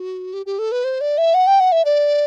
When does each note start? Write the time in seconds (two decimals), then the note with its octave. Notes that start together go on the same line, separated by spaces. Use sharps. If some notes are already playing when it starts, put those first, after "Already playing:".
Already playing: F#4
0.33 G4
0.46 G4
0.59 A4
0.72 B4
0.84 C5
1.01 D5
1.18 E5
1.34 F#5
1.47 G5
1.60 F#5
1.72 E5
1.85 D5